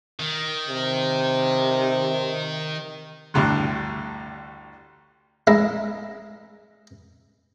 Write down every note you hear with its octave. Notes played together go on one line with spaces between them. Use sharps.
D#3
C3
A1 D2 G2
G#3 D#4 E4